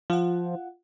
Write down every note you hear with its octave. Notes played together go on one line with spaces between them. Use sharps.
F3 F4 F#5